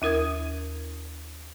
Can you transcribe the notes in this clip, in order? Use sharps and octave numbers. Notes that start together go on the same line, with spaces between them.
D#2 E4 A#4 D#6 G#6